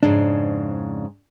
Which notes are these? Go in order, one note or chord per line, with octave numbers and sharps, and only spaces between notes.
F2 G#2 C#3 D4